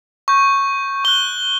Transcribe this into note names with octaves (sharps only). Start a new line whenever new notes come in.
C#6 G6
C#6 F#6 G7